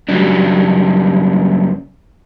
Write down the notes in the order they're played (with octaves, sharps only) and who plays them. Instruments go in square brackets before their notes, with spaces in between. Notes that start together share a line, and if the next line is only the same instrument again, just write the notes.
[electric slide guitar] F#2 C#3 F#3 G3 D4